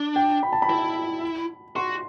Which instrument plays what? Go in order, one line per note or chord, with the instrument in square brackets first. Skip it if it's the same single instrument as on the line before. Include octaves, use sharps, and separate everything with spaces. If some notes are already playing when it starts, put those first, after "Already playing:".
Already playing: [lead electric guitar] D4
[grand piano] G5
B5
A5
B5
[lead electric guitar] E4
[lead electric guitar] F#4 [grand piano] C6